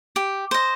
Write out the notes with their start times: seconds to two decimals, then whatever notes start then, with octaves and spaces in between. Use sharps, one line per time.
0.16 G4
0.51 C5 D#5